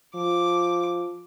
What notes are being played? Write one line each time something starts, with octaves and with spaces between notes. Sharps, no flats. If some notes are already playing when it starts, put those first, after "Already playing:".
F3 D6